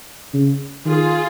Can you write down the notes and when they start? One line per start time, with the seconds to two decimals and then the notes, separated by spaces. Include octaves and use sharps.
0.34 C#3
0.85 D#3 F4 G#4